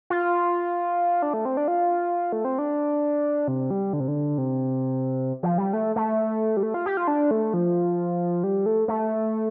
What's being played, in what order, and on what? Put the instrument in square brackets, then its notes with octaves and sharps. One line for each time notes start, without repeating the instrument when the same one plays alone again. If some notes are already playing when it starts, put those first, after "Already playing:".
[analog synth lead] F4
D4
A3
C4
D4
F4
A3
C4
D4
C3
G3
D3
C3
D3
C3
F3
G3
A3
A3
G3
A3
F4
G4
F4
D4
A3
F3
G3
A3
A3